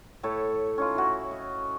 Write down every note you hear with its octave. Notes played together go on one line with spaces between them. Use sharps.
A2 A4 C#5 B5
C#4 D#4 F4
E4 F#4
D#5